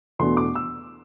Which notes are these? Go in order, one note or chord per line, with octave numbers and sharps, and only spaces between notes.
E2 B2 A3 D4 C6
D6
E6